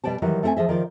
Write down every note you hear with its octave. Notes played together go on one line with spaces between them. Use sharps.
B2 G3 D5 G5 A5
D#3 E3 F#3 G3
A3 C4 A#4 E5 G#5
F3 G#4 D#5 E5
D#3 F3 D5